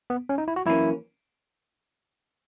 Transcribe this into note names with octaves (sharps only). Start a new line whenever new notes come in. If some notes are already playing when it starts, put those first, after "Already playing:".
B3
C#4
D#4
E4
F#4
F#2 E3 A#3 C#4 E4